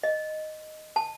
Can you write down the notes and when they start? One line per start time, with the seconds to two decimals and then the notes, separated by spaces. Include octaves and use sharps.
0.03 D#5
0.96 A5